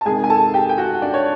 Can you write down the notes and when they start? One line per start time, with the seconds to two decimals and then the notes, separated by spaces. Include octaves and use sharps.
0.01 A5
0.05 C3 D#3 G#3 G#4 G#5
0.24 G#5
0.30 A4 A5
0.54 G4 G5
0.69 G5
0.78 F#4 F#5
1.02 D4 D5
1.14 C#5